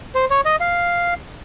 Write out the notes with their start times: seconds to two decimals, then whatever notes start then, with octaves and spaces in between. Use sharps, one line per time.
0.15 C5
0.30 C#5
0.45 D#5
0.60 F5